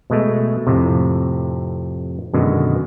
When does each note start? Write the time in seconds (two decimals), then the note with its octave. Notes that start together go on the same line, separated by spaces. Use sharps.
0.10 B2 G#3 A3
0.67 F2 A2 C3
2.34 F#2 B2 D3 D#3 G#3